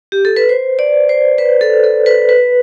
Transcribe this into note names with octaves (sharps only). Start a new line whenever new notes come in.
G4
A4
B4
C5
D5
C5
B4
A4
A4
B4
B4